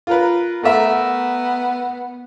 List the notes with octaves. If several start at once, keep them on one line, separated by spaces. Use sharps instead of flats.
F4 A#4 B4
A3 B3 A#4 E5